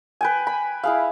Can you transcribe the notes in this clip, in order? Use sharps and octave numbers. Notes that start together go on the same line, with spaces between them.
B4 G5 G#5
B5
E4 G#4 F5